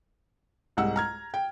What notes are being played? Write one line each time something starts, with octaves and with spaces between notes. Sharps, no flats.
C2 G#2 F#5 E6
A#5 F6 G#6
G5